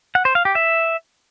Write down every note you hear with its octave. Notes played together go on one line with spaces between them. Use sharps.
F#5
C5
F5
G4
E5